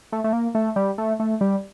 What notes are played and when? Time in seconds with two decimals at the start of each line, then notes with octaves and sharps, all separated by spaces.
0.12 A3
0.24 A3
0.33 A#3
0.55 A3
0.76 G3
0.98 A3
1.20 A3
1.41 G3